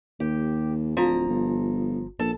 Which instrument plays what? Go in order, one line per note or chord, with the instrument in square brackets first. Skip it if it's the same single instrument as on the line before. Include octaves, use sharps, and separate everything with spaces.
[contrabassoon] D#2 [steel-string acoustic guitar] G4
[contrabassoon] D1 [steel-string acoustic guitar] F3 A#5
[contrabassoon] G1
[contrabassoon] A#1 [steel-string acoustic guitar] A4